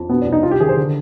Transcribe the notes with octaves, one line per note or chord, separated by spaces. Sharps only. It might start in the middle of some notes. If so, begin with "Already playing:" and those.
Already playing: F2
B2 B3
D4
C2
D#4
C2 F4
G4
D#3 G#4
C5
D3